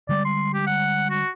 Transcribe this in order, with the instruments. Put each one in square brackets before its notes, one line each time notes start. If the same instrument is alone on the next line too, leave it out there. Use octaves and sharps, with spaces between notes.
[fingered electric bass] D3 G3 G#3 [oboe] D5
[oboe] C6
G4
F#5
F#4